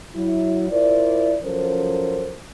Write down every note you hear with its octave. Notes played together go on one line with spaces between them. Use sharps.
F#3 E4
E4 F4 A#4 C5 D5
F3 F#3 C#4 A4 A#4 C5